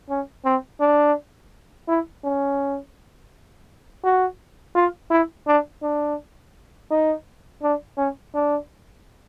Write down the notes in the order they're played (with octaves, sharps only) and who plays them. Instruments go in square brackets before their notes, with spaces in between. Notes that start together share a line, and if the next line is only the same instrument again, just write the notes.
[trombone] C#4
C4
D4
E4
C#4
F#4
F4
E4
D4
D4
D#4
D4
C#4
D4